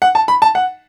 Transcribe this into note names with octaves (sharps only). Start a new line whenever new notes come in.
F#5
A5
B5
A5
F#5